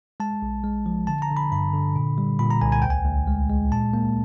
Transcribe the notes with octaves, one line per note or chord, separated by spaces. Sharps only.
G#3 A5
A#1
G#3
F3
D3 A5
A#5
D3
B5
G2 B5
D3
A#2
G3
A#2 B5
A#5
C2 G#5
G#5
D2 G5
G#5
D2
G#3
G#3
A#2 A5
A#3